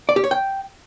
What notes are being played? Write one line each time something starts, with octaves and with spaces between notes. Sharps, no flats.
D5
G4
C#5
G5